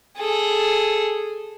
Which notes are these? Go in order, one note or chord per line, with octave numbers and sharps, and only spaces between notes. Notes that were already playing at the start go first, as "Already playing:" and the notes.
G#4 A4